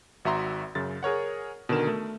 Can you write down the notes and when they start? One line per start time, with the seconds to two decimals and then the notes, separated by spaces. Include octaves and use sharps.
0.25 G#1 F#4 E5 A#5 C6
0.75 F#2 C#3 A6
1.03 G#4 A#4 C#5 F#5
1.69 B2 D3 D#3 A#4 E7
1.87 A3